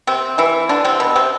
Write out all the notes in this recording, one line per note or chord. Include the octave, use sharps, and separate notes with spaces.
C3 C4
E3 E4
D3 D4
C3 C4
B2 B3
C3 C4